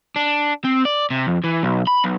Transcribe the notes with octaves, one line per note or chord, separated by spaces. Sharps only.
D4
C4
D5
C3
F2
E3
B1
B5
B1